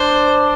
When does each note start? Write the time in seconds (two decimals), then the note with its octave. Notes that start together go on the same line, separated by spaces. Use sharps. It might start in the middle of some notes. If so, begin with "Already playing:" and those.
Already playing: D4 C5